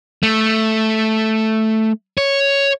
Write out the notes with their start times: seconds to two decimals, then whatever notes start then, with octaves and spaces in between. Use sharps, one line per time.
0.23 A3
2.18 C#5